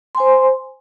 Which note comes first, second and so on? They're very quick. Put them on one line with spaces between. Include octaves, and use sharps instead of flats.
C6 G#5 C5